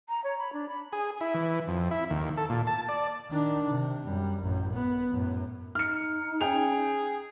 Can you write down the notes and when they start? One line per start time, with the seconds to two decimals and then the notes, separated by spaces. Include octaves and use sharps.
0.09 A#5
0.24 C#5
0.39 B5
0.53 D4
0.69 B5
0.92 G#4
1.21 E4
1.34 E3
1.68 F2
1.91 E4
2.10 D#2
2.37 A4
2.50 A#2
2.67 A5
2.89 D5
3.30 D#3 D4
3.71 C3
4.04 F#2 G3
4.42 A1 F#2
4.74 B3
5.11 F#2 A2
5.75 D#4 F6 C#7
6.41 C#4 G#4 G5 F7